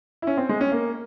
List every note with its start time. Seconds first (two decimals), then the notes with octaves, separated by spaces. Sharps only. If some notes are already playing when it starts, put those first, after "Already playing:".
0.22 E4
0.27 C#4
0.37 C4
0.49 G#3
0.61 C#4
0.72 A#3